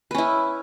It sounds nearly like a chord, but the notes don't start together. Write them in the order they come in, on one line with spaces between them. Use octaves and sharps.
B4 C#4 E4